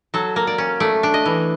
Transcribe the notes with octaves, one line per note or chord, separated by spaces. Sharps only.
F#3 A4
A#3
D5
C#4
A3 D5
D4
D#5
E3